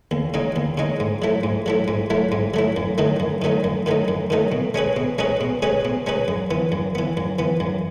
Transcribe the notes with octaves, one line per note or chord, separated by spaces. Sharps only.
D#2
C#3 G#3 D#4
D#2
C#3 G#3 D#4
G#2
F#3 A3 E4
G#2
F#3 A3 E4
G#2
F#3 A3 E4
G#2
F#3 A3 E4
F#2
D#3 F#3 A3 D#4
F#2
D#3 F#3 A3 D#4
F#2
D#3 F#3 A3 D#4
F#2
D#3 F#3 A3 D#4
B2
G#3 C#4 G#4 B4
B2
G#3 C#4 G#4 B4
B2
G#3 C#4 G#4 B4
B2
G#3 C#4 G#4 B4
F#2
E3 B3
F#2
E3 B3
F#2
E3 B3
F#2